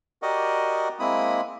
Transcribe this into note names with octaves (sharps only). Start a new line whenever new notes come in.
F#4 G4 A#4 D5 D#5 F#5
G#3 A#3 C4 E4 B5 D#6